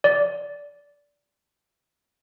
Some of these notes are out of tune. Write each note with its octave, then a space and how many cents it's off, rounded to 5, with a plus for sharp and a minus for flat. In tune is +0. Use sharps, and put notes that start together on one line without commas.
D5 -15